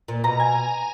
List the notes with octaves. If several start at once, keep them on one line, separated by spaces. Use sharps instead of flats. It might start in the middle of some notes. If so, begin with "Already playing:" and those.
A#2
B2 A#5
G#5